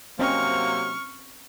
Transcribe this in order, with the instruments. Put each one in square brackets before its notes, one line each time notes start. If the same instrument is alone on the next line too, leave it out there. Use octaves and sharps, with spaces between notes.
[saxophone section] C3 F#3 A#3 [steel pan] C4 C#4 D#5 [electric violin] C#6 F6